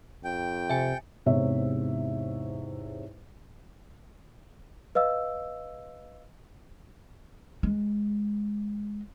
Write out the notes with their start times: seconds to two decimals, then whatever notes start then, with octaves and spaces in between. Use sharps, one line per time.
0.24 F2 G5
0.70 C3 E5 G#5
1.26 E2 G#2 C3 C#5 E5
4.95 B4 D#5 F5 E6
7.63 G#3